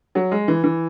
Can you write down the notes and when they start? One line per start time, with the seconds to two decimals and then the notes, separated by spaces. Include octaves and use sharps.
0.15 F#3
0.31 G#3
0.48 E3
0.64 E3